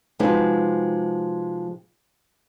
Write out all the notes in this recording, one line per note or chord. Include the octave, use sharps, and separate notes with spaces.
C3 F3 G#3 D#4 F#4 B4